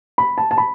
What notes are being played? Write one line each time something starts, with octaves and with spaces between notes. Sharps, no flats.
B5
A5
A5
B5